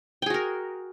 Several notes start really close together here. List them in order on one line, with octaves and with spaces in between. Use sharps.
G5 G#4 F#4 A#4